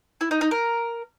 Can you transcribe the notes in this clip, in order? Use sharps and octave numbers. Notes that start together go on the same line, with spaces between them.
E4
D#4
D#4
A#4